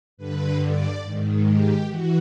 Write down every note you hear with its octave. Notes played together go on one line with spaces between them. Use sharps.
G2 D3 B4
D5
G#2 D#3
G4
E3 F#4